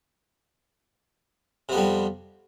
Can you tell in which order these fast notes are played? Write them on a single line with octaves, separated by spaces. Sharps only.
C3 B3 F2 G3